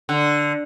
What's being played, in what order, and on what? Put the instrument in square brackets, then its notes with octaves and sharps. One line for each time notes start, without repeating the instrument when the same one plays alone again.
[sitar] D3